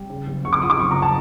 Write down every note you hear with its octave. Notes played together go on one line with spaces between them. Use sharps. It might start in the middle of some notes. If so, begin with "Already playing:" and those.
Already playing: G3
C#3
F#1
F#1 C#6
D6
F3 D#6
D6
F#1 C#6
A#5
A5